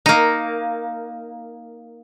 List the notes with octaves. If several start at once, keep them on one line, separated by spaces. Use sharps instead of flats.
A#3 D#4